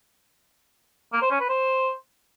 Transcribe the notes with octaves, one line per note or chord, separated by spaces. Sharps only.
A#3
C5
C#4
B4
C5